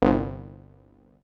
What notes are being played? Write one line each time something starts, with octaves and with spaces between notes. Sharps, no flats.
G1 C2